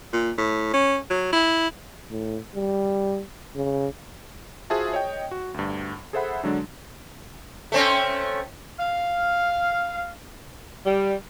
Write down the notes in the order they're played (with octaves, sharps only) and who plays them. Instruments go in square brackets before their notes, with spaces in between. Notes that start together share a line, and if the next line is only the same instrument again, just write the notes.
[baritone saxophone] A#2
A2
C#4
F#3
E4
[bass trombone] A2
G3
C#3
[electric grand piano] F4 F#4 G#4 C5 E5 A5
C#5 D#5 G5
F#4
D2 G2
G#4 A4 C5 E5 F#5 B5
D3 F#3 G#3 D4
[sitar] A3 C4 C#4
[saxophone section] F5
G3